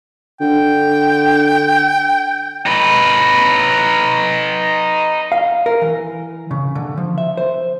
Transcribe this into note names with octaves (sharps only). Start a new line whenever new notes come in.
D3 G5
D#4 B4
F5
A#4
E3
C#3
D3
F3
E5
C5